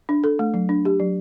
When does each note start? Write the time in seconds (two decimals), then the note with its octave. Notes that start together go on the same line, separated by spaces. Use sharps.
0.09 D4
0.24 A4
0.39 A3
0.54 F#3
0.69 D4
0.85 G4
1.00 F#3